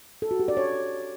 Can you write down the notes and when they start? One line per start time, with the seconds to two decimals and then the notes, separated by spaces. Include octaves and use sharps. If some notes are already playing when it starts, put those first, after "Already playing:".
0.22 A4
0.31 F#4
0.40 G4
0.48 D5
0.57 C#5